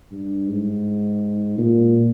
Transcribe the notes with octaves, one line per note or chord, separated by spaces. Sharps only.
G2
G#2
A#2